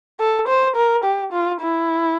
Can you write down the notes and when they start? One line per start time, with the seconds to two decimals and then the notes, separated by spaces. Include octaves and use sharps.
0.20 A4
0.48 C5
0.76 A#4
1.04 G4
1.32 F4
1.60 E4